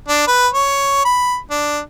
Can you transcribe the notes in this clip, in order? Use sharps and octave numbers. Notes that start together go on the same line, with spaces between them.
D4
B4
C#5
B5
D4